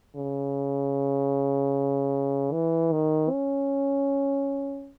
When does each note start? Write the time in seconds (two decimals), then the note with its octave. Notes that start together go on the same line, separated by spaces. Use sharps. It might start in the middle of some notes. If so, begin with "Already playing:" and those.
0.16 C#3
2.52 E3
2.92 D#3
3.31 C#4